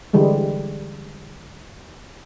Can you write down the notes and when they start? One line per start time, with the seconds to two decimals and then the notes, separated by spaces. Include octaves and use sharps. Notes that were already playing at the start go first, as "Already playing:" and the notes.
0.14 D3 E3 G3 G#3